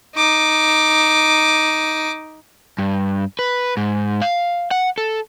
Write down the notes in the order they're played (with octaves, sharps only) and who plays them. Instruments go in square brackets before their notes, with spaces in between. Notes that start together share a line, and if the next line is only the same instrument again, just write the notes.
[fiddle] D#4 D6
[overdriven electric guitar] G2
B4
G#2
F5
F#5
A4